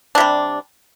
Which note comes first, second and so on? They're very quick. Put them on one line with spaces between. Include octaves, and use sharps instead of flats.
D4 C3 G3